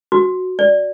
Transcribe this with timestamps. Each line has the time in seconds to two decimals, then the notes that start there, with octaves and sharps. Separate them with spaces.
0.12 F#4
0.59 D5